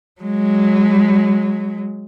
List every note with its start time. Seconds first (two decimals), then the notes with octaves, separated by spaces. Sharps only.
0.21 F#3 G#3